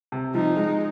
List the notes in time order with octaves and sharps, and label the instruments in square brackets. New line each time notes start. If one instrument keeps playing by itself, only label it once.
[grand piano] C3
[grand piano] F3 [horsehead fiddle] D#4
[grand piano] G#3